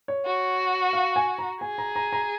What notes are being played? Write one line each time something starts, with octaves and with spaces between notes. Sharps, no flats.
C#5
F#4
F5
G#5
A#5
G#4 G#5
A#5
A#5
A#5